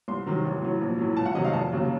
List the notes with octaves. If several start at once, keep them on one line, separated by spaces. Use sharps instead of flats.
C2 C6
C3 D#3 F#3
A1
A2 F#3
A#1
A2 F#3
C#2 A5
F#5
C3 D#3 F#3 D#5
F5
F1 A5
D#2 C#3 F#3